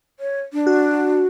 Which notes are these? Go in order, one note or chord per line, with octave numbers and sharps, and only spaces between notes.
C#5
D4
F#4